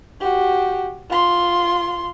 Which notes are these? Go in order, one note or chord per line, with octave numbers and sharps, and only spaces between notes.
F#4 G4
F4 C6